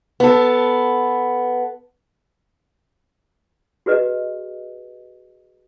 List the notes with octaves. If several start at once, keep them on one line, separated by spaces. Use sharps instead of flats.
B3 A4
F#4 G#4 B4 D#5